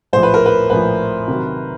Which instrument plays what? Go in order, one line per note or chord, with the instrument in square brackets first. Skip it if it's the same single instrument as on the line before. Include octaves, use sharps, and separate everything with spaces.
[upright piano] A#1 A2 F3 [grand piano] C5
[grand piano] B4
A#4
B4
[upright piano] A#1 A2 F3 [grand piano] B4
[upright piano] C3 D#3 F#3